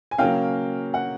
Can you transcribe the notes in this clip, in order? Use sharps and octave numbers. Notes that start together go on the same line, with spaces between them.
G#5
C#3 F#3 A#3 C#4 F5 G5
F#5